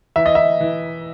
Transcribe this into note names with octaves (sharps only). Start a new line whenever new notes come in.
E3 E5
D#5
E5
E3